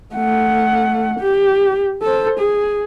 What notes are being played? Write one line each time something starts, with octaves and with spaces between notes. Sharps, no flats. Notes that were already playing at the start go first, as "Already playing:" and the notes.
A3 F#5
G4
A4 C5
G#4